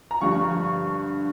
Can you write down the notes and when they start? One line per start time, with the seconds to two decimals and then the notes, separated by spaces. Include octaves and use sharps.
0.11 A#5
0.21 G2 D3 F3 C#6